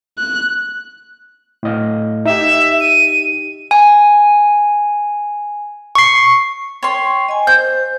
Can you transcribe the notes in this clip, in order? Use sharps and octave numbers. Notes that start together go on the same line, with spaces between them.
F#6
A2 D#5 F5
D#4 G4 E5
D#7
G#5
C#6 C7
C#5 G5 C6
D#5 G#5
C5 G6